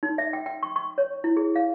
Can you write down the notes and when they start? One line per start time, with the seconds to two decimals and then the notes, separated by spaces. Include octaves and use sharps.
0.03 D#4
0.18 E5
0.33 G5
0.46 G5
0.63 C#6
0.76 C#6
0.98 C#5
1.24 E4
1.37 G#4
1.56 F5